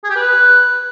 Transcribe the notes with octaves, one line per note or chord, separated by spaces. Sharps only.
G#4
G4
B4